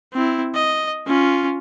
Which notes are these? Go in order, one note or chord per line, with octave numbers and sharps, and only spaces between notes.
C4 E4
D#5
C#4 F4